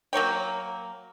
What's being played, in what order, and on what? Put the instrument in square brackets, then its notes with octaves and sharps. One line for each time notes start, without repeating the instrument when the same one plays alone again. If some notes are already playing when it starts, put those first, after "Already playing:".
[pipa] F#3 A#3 C#5 G5